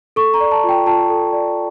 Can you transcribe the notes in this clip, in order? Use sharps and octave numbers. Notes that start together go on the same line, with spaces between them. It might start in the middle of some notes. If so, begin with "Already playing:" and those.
A4 C#6
A#5
D5
A5
F4 G5
F4 A5
A4
D5